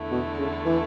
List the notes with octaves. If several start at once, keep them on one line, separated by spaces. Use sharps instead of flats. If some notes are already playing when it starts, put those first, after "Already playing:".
Already playing: E2 D3 A3 E4
B2
C#3
E3